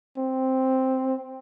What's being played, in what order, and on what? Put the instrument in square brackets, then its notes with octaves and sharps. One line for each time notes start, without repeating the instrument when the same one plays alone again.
[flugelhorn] C4